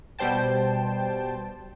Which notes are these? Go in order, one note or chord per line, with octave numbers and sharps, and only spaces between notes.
B2 G3 C5 G5 A5